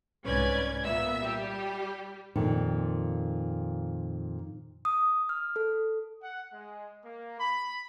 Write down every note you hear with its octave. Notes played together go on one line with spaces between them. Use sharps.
C2 G#2 C#4 B4 D5 G#6
A#2 B3 E5 E6
G3 G4
F2 A#2 D#3
D#6
F6
A4
F#5
G#3
A#3
B5